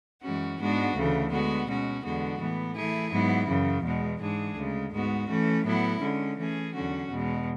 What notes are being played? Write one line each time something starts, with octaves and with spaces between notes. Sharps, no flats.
F#2 E3 G#3 C#4 F#4
G#2 G#3 B3 D4 F#4
D2 C#3 E3 A3
D3 G#3 B3 F#4
B2 G#3 C#4 F#4
E2 D3 G#3 B3 F#4
A2 E3 B3
E3 A3 E4 G#4
G#2 F#3 B3 E4
F#2 C#3 E3
E2 B2 G#3
G#2 E3 G#3 D4 G#4
D2 C#3 G#3
G#2 G#3 B3 F#4
E3 A3 C#4
A2 F#3 B3 E4
D3 G#3 C#4
E3 A3 C#4 G#4
E2 D3 F#3 C#4 F#4
E2 B2 G#3